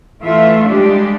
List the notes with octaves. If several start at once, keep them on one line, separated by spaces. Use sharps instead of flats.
E3 A3 F4 E5
G3 G#3 D4 G4